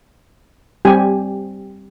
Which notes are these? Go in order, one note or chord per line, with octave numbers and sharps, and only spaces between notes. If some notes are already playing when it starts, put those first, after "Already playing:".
G3 C4 G4 G#5